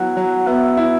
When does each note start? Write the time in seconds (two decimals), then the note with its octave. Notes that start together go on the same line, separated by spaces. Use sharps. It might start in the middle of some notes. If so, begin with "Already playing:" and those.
Already playing: F#3 B3 E4 F#5
0.17 F#3
0.47 B3 E5
0.77 E4